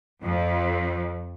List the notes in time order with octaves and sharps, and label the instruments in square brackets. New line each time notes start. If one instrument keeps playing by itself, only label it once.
[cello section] F2